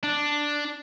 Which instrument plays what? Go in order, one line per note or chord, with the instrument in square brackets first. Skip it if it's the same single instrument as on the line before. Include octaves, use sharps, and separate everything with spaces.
[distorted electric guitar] D4